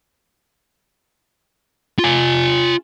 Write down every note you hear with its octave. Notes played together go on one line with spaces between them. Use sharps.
F4 G#5